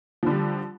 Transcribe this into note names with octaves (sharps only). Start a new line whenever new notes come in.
D3 F3 G3